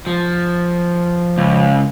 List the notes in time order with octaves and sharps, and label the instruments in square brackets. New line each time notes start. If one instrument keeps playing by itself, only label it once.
[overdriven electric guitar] F3
[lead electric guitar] C#2